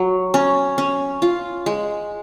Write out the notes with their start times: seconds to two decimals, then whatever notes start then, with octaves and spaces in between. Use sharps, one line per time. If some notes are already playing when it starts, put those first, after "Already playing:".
Already playing: F#3
0.34 C#4
0.78 C#4
1.22 F4
1.66 G#3